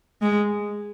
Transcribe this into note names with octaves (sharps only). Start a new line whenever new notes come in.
G#3